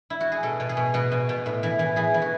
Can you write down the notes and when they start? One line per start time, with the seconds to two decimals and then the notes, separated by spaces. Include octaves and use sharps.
0.10 E4
0.20 F#4
0.32 G#4
0.43 B2 A4
0.60 B2
0.69 G#4
0.77 B2
0.94 B2 F#4
1.12 B2
1.29 B2
1.46 A2
1.63 E3
1.79 E3
1.96 E3 G#4
2.14 E3
2.22 F#4